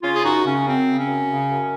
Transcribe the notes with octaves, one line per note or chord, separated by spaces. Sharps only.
C#3 C#4 F4
G#4
F#2 D#4 F#4
C#3 C#4
F#2 C4
C#3
C#4
F#2
C#3
F#2